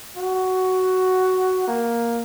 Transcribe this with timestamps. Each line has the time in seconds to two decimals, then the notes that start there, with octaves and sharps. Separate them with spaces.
0.17 F#4
1.68 A#3